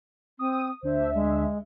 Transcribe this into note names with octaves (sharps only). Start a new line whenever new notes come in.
C4 D#6
D2 D4 C5 E5
G#3